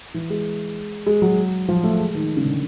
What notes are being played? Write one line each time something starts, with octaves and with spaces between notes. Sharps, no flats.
E3
G#3
G#3
F#3
F3
A3
G#3
D#3
C#3
D3